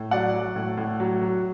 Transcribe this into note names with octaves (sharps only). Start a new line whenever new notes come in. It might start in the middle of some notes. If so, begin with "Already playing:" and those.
Already playing: A2
F#3 D5 F#5
F#3
A2
A2
F#3
F#3